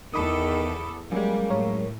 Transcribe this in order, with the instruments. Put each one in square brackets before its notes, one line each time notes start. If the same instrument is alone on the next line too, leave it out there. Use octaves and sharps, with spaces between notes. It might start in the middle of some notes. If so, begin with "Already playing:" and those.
[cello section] E2 A4 [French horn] D#3 [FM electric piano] B5 D6 D#6
[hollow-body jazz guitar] F#2 G#3 [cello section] G3 [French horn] A#3
[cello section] A2 [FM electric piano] A#4 C#5